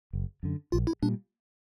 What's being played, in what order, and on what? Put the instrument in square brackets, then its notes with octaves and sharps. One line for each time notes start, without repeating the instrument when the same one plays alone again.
[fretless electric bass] F#1
F#2 D3
[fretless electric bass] A#1 [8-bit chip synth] F4
[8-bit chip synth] E4
[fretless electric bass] A#2 G3 [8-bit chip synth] D4